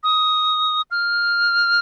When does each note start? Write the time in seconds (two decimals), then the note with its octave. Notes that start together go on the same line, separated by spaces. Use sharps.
0.03 D#6
0.91 F6